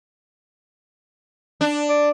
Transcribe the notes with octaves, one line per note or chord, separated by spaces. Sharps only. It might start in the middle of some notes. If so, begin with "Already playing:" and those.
D4
D5